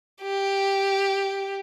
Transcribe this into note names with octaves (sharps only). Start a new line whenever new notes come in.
G4